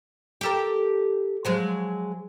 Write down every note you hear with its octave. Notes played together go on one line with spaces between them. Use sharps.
G4 A4 A#4
F3 F#3 G#3